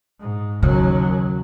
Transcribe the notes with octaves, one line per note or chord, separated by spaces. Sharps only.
G#2
D#2 C#3 F#3